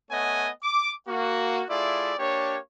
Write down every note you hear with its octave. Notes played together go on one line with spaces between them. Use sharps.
A3 B3 C#5 D#5 F#5 G#5
D6
A#3 F#4
A3 E4 F4 G#4 D5
A#3 D4 G4 C#5